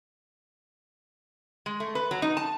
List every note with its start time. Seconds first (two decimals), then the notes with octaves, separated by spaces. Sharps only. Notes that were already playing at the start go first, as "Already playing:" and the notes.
1.66 G#3
1.80 A3
1.95 B4
2.11 F#3
2.22 D#4
2.37 A5